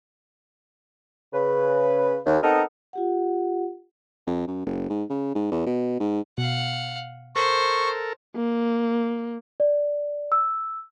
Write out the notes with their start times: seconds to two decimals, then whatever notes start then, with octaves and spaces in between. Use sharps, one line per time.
1.33 C#3 B4
2.25 D#2
2.43 B3 C4 D#4 A4 A#4
2.93 F4 G4 F#5
4.27 F2
4.47 F#2
4.66 F#1
4.90 G#2
5.10 C#3
5.35 G#2
5.52 E2
5.66 B2
6.00 G#2
6.38 B2 F5 F#5
7.36 A4 A#4 C5 C#6
8.36 A#3
9.60 D5
10.32 E6